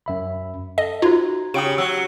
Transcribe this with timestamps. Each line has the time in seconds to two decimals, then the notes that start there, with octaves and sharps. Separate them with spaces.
0.06 F#2 E5 B5
0.78 A4 D#5
1.02 D#4 F4 F#4 C5 A#5 G#6
1.54 C#3 G4 G5 D#6 D7
1.78 F#3 E6